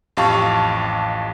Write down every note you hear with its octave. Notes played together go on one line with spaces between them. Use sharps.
A1 F2 G4 F5 A5 C#6